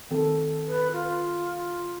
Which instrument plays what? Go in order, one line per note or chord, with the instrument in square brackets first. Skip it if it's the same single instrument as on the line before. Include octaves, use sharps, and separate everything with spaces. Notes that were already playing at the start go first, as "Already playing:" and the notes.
[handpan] D#3 C4 A4
[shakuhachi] B4
F4